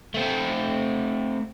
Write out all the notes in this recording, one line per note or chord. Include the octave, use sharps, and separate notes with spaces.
A3 C4